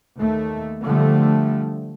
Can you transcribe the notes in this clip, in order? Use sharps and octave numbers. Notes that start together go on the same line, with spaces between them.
D#2 A3
D3 F3 G3 A3